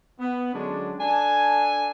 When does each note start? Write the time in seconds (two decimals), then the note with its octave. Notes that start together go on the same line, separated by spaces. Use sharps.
0.20 B3
0.54 D3 F#3 G#3 C#4 D4
0.99 D4 A4 G#5